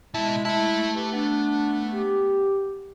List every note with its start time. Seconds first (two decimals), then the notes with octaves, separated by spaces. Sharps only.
0.14 B2 G#3 E4 A5
0.45 A3 E4 A5
0.94 G4 B4
1.13 B3 D4
1.93 G4